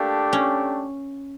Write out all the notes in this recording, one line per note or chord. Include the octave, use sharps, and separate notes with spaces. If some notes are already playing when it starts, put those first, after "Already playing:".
Already playing: A3 A#3 D4 G4
C#4